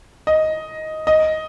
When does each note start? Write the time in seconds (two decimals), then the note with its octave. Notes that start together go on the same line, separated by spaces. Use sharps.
0.27 D#5
1.07 D#5